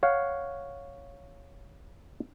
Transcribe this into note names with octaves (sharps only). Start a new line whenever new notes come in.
C#5 F5 F#5